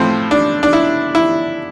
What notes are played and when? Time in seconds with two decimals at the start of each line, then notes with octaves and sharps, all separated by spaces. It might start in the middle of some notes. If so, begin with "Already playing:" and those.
Already playing: A2 F3 C4
0.31 D4
0.63 D4
0.73 E4
1.15 E4